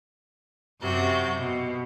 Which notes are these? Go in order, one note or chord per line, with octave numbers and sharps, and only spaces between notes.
F#2 C3 F#4 G6
B2